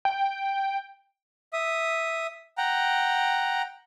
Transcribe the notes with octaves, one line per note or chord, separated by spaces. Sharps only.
G5
E5 D#6
F#5 G5 A#5